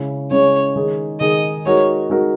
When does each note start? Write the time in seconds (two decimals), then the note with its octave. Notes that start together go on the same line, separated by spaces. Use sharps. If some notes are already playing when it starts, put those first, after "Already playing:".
Already playing: C#3 G#3 C#4 E4
0.31 C#3 G#3 C#4 E4 C#5
0.76 D#3 G#3 D#4 G#4
1.20 D#3 G#3 D#4 G#4 D#5
1.66 G#3 D#4 F#4 A#4 C#5
2.10 G#3 D#4 F#4 A#4